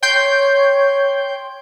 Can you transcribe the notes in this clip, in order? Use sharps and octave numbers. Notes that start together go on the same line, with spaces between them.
C#5 G5 C6 G6